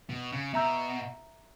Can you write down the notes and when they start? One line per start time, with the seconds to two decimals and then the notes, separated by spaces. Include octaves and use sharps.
0.10 B2
0.32 C#3
0.54 B2 E5 A#5 E6 G6